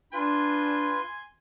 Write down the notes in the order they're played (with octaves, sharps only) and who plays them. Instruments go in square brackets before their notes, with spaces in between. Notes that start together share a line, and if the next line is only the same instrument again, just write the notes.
[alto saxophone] D4 [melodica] F4 B4 [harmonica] G#5 C6